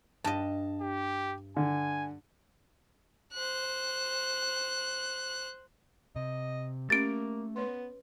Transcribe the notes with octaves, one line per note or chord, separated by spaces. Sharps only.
G2 D#5 A5
G4
D3 G#5
C5 F#6
C3 D#5
A3 A#3 C#4 G4 A6 D7
B3 B4 C#5 C6